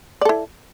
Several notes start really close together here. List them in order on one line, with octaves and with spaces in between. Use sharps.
D5 A4 E4